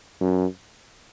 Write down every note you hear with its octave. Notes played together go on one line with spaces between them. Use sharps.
F#2